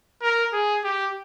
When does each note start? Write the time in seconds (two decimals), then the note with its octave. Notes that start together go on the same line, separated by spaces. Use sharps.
0.22 A#4
0.53 G#4
0.84 G4